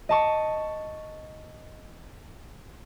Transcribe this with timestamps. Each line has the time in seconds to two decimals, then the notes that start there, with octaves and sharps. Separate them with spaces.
0.09 D#5 A5 C#6